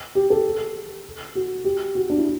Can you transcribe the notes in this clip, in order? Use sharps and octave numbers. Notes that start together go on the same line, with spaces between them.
G4
A4
F#4
G4
F#4
D4
E4